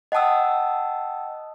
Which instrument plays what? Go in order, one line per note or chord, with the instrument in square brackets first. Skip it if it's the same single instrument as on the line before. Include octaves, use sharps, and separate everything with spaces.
[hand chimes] D#5 F#5 G5 A5 D#6 E6